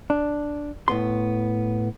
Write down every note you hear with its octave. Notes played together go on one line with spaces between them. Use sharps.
D4
A2 B3 C6